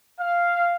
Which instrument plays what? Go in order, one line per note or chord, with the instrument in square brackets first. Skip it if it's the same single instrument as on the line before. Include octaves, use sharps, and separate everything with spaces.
[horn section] F5